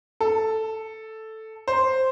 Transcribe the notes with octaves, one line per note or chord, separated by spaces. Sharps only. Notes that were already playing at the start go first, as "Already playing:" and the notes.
A4
C5